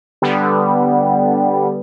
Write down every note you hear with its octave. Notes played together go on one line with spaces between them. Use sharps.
D3 G3 B3